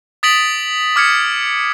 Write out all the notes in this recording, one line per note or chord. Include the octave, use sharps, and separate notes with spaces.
D#6 A6 B6 D7 F#7
D6 F6 G#6 C#7